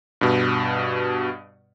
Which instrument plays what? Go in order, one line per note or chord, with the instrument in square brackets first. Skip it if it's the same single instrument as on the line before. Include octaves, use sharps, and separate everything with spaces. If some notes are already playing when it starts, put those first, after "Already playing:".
[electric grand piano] G2 B2